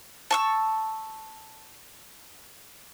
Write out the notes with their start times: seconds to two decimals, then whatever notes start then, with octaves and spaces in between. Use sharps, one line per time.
0.31 A5 C#6 E6